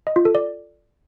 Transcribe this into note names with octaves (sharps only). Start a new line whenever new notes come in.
D#5
F4
A4
D5